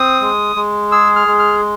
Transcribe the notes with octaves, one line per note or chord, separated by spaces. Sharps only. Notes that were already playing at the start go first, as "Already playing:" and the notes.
Already playing: C4 D#6
G#3
G#3
G#4 E6
F6
G#3
F6